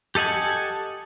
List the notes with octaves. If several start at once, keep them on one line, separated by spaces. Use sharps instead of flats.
G4 A4 D#5 F#5 G#5